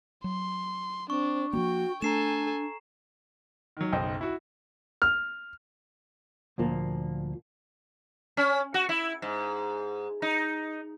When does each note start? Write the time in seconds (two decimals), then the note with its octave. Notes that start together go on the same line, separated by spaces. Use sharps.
0.24 F#3 C6
1.10 C4 D4 C#6
1.53 F3 F#3 A#3 F#4 G5
2.02 A3 D4 A4 G#5 A#5 C7 E7
3.77 D#3 F#3
3.92 F#1 B1 C5 D#5 G5
4.21 E4 F#4
5.02 F6
6.58 D2 A#2 F3 A#3
8.37 C#4
8.74 F#4
8.89 E4
9.22 G#2
10.22 D#4